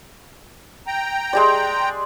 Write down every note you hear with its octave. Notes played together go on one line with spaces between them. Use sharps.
G5 A#5
G#3 G4 D5